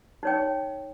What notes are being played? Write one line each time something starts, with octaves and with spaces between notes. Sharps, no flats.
D#4 C#5 G5